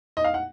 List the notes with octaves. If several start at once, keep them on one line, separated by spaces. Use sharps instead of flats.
D#5
F5
F#5